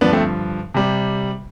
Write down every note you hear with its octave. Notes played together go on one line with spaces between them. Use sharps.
G2 D3 F3 B3 D4
A3 C4
C3 G3